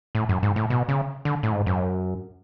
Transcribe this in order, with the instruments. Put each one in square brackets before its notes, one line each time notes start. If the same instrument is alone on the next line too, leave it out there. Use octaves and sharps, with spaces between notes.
[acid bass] A2
F#2
G#2
A2
B2
C#3
D3
A2
G#2
F#2